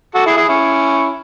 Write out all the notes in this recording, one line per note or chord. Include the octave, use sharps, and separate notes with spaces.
F#4 A4
E4 G#4
E4 G#4
C#4 E4